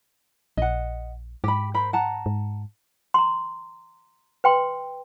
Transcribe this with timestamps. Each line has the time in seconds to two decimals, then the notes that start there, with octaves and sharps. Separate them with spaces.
0.57 A#1 D#5 F#5
1.44 G#2 G4 B5
1.74 A#4 C5 B5
1.93 F#5 A5 A#5
2.26 G#2
3.14 A#5 C6
4.44 B4 G5 C6